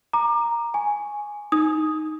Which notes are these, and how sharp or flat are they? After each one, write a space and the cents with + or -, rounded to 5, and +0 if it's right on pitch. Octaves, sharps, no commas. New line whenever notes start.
A#5 +0 D6 +30
G#5 +0 C#6 +0
D#4 +0 D#6 +5